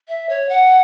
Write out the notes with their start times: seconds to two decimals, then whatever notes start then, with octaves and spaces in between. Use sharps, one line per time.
0.08 E5
0.29 C#5
0.49 F#5